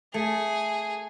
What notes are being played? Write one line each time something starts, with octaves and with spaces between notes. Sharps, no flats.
A3 G#4